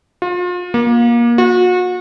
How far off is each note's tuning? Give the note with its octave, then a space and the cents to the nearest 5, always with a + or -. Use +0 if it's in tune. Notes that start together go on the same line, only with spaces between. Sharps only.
F4 +35
A#3 +25
F#4 -35